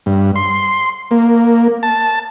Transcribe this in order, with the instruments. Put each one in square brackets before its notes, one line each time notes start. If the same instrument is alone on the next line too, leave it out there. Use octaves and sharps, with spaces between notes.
[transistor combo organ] G2
C6
A#3
A5